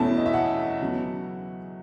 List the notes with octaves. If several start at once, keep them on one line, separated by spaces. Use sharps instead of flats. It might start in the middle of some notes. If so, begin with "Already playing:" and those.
Already playing: E2 B2 A3 C#4 E4 A5
D#5
E5
F#5
C#3 F#3 B3